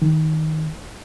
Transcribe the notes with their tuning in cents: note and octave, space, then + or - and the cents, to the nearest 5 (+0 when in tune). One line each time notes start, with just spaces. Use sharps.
D#3 +10